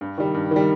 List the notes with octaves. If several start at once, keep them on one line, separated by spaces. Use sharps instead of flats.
G2
D#3 G3
G2
D#3 G3